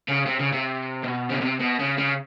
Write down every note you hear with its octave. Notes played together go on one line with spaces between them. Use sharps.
C#3
C3
C#3
C3
B2
C#3
C3
B2
C#3
C#3